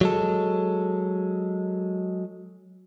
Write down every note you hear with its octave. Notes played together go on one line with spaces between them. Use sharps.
F#3 G#3 A4